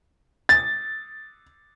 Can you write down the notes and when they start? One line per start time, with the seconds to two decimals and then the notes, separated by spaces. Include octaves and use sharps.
0.49 A6